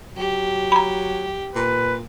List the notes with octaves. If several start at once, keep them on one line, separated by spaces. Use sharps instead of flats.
F#3 G4
A#5 B5
A#2 B4